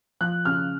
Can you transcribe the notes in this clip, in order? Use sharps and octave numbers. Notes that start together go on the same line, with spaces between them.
F3 F#6
C#3 F6